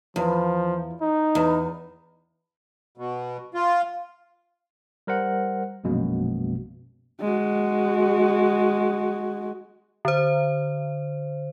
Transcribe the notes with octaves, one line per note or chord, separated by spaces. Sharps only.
E2 F3
D#4
E2
B2
F4
G3 A#4 C5 F#5
A#1 F#2 B2 G#3 A#3
G#3 F#4
D3 C5